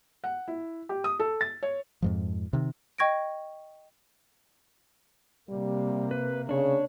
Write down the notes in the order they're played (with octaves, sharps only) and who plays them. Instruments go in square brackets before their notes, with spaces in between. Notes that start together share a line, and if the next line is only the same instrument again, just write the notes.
[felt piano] F#5
E4
G4
D#6
A4
A6
C#5
[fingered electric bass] F2 G#2 F3
C3 D#3
[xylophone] D#5 G5 C#6 G#6 A#6 D7
[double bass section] C3 A#3 [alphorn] G3
[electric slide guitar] B4
[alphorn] C#3 [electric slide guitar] D4 C#5